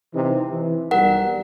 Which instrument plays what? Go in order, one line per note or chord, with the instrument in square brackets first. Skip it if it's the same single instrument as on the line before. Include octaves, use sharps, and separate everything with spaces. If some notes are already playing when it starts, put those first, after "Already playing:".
[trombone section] C3 E3 D#4
E3
[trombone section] B1 G3 [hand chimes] A#4 F#5